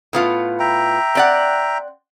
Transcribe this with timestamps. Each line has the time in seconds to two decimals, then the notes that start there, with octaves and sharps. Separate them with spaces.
0.13 A2 B3 F4
0.60 E5 G5 A#5
1.15 C4 D5 F#5